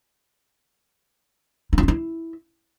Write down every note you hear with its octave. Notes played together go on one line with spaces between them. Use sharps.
D#4
E4
D4
E4